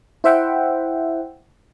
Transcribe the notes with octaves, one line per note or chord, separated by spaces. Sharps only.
E4 C5 E5 F#5 G5